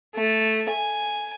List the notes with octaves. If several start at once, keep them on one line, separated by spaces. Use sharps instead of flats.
A3
G#5